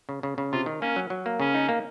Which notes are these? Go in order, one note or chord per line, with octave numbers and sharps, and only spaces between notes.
C#3
C#3
C#3
C3 F4
D#3
A#3 C#4
F#3
F#3
A#3
C#3 C#4
D#4
A#3